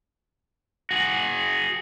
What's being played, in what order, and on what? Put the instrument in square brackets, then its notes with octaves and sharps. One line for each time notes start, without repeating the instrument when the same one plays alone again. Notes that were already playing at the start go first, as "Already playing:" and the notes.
[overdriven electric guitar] F#4 G#4